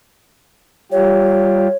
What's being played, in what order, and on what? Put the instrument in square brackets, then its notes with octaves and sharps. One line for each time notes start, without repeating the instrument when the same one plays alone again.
[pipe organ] G3 F4 G4 [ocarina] C#5